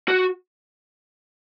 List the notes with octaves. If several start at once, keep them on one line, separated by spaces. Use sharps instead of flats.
F#4